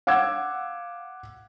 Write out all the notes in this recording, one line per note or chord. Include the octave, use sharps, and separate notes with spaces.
F5 F#5 D6 E6 G#6